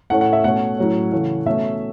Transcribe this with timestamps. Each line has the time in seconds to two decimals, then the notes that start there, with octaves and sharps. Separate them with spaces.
0.10 A2 A3 C#4 F#5
0.21 F#5
0.33 E5
0.44 B2 A3 C#4 F#5
0.78 A2 F#3 C#4
1.12 C#3 E3 A3 C#4
1.46 B2 A3 C#4 E5